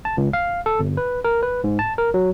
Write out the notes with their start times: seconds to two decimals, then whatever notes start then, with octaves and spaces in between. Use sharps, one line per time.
0.05 A5
0.17 C#2
0.33 F5
0.66 A4
0.79 G1
0.97 B4
1.25 A#4
1.43 B4
1.64 G#2
1.79 A5
1.98 A#4
2.14 F#3